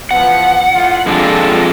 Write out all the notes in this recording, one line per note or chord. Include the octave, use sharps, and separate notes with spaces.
E3 F3 B3 F#5
A2 E4 F4
F2 G3 G#3 D4 F4 A4